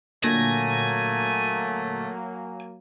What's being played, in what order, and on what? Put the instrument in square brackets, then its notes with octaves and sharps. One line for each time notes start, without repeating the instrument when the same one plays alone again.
[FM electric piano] A#2 D3 A#6 [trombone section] F#3 A#3 [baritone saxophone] A3 [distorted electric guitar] G#5